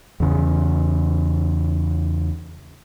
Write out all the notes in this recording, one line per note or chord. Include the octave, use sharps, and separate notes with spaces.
E2 C#3